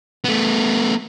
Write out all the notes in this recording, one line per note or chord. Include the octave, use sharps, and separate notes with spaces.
A3 B3